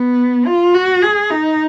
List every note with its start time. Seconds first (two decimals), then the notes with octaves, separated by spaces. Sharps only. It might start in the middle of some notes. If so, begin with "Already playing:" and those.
Already playing: B3
0.46 F4
0.74 F#4
1.02 G#4
1.30 D#4